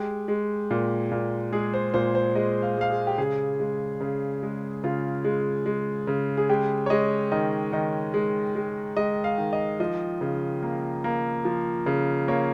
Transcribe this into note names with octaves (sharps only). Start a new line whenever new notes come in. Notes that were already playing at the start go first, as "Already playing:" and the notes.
Already playing: G#3 G4
G#3
A#2
A#2
G#3 G#4
C5
A#2 C5
C5
G#3 D#5
F5
G#3 F5
G#4
G4
C#3 G#4
G#3
C#3
G#3
C#3 F4
G#3
G#3
C#3
G#4
G#3 G4
C#5
G#3 D#5
D#3 D#5
D#3 D#5
G#3
G#3
G#3 D#5
F5
D#3
D#5
F3 D#5
C#3
A#3
A#3
F3
C#3
A#3 C#5